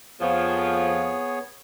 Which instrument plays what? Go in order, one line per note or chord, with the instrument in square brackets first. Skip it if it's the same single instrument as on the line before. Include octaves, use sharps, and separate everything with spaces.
[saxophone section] F2 F3 [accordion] B3 G#4 C#5